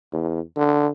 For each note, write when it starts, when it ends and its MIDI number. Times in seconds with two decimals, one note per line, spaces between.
0.13 0.40 40
0.57 0.89 50